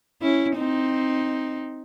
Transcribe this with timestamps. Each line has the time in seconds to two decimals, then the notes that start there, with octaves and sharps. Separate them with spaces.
0.22 C#4 E4
0.57 C4 D#4